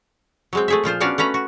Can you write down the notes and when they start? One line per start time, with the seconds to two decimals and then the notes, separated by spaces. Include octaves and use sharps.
0.53 F#3 G#3 C4
0.68 A3 G#4 E5
0.84 A#2 F3 F4 C5
1.00 B3 C#4 D4 F#4 D5 F5
1.18 A3 C#4 B4 A#5
1.34 F#4